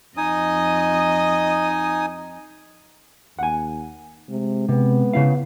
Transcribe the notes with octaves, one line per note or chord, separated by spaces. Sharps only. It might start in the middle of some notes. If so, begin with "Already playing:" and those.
F2 D#4 D#5 G#5 D#6
D#2 F#5 G#5
C3 G#3
C3 B3
C#3 E4 F5